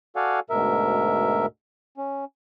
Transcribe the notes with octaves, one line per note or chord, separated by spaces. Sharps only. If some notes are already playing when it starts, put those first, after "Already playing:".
F#4 A4 D5 F5 F#5 G#5
D2 G#2 B2 A#4 E5
C#4